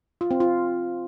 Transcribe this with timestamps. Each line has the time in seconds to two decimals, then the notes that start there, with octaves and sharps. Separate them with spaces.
0.21 F4
0.31 C4
0.40 F4